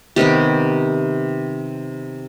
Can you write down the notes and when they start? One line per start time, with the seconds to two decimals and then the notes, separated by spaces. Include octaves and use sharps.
0.16 C3 D#3 B3 G4